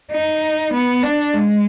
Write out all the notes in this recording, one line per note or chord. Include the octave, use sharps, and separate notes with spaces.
D#4
B3
D4
G#3